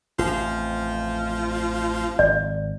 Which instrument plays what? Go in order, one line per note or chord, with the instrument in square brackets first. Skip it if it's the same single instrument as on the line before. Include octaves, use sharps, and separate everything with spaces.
[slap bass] A1 F2 [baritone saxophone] F3
[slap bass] G#1 [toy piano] D5